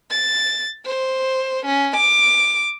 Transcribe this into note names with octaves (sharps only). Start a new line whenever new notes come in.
A6
C5
C#4
D6